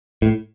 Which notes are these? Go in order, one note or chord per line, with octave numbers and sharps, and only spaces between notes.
A2